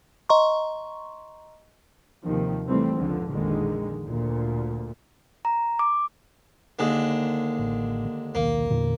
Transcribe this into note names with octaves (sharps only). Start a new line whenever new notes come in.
D#5 A#5 C6 C#6
D#2 C3 D#3 F3
C3 E3 G3 A3 C4
F1 C#2 D3 F3
A#1 F2 D3 D#3 G#3
D2 A#2
A#5
D6
D#2 D3 G#3
A1
A#3
D#1 B1 D#3 A#3
E2 A#2 D3